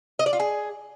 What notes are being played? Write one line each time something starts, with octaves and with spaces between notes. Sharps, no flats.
D#5
D5
F4
G#4